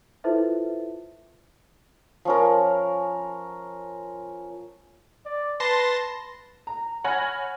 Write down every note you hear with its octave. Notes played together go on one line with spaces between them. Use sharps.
E4 F4 A4 B4 C5 E5
F3 C#4 A#4
D5
B4 A5 C6 A#6
A#5
C#5 F#5 G#5 B5 F6 A#6